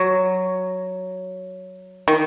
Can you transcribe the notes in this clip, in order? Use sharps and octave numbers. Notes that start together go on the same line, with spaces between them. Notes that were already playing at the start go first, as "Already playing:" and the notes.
Already playing: F#3
D#3